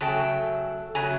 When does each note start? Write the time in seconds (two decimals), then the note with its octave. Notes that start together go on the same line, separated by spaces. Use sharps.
0.01 C#3 F#3 A3 G5 A5
0.95 C#3 F#3 A3 G#5 A#5